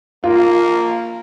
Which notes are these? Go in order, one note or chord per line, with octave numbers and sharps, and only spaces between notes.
A#3 F4